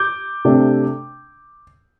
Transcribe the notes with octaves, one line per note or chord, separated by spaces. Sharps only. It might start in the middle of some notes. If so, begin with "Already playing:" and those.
Already playing: D6 G6
C3 A3 D4